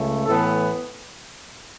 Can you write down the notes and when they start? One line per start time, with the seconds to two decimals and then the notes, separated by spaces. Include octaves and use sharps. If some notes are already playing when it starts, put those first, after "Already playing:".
Already playing: C#2 C#3 A3
0.26 A2 E3 B3 A4